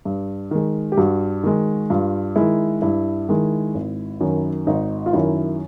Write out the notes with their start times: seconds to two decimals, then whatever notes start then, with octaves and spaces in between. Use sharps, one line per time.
0.05 G2
0.51 D#3 G#3
0.92 G4
0.97 G2 F#4
1.43 D#3 G#3
1.90 G2 F4
2.36 D#3 G#3 E4
2.82 G2 E4
3.29 D#3 G#3
3.75 G#1
4.20 F#2 D#3
4.67 G#1 D#4
5.06 F4
5.13 F#2 D#3 E4